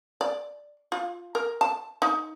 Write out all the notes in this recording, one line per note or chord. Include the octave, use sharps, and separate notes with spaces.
D5
F4
A#4
A5
D#4